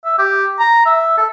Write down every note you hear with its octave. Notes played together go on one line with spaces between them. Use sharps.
E5
G4
A#5
E5
A4